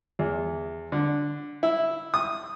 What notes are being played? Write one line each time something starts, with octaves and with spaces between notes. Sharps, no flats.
E2
D3
E4
D#6